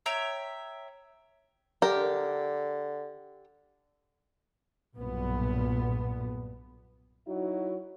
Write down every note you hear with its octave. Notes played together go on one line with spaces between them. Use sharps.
C#5 E5 G5 A#5
D3 G4 A#4
B1 G2 A#2 B3
F#3 D#4 E4 F#4